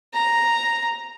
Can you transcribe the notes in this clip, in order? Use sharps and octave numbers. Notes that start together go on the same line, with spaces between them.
A#5